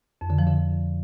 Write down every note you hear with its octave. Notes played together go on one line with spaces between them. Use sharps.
F2
D3
F3
D3